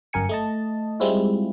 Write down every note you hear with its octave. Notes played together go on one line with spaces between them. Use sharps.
G1 F#2 A#4 G#5 C#7
A3 D#5 A5
G3 G#3 C4 E4 F4